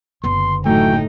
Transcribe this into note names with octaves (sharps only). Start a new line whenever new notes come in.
F#1 D3 B3 C6
A2 E3 F#3 A3 D#4 G5